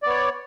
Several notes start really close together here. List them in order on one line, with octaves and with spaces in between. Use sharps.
D5 B3 C#5